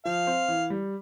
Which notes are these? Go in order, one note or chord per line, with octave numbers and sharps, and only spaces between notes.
F3 F5
C4
E3
G3